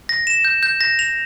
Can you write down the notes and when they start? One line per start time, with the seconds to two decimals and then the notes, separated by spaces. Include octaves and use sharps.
0.09 A#6
0.27 E7
0.45 G6
0.63 G6
0.81 A#6
0.99 F7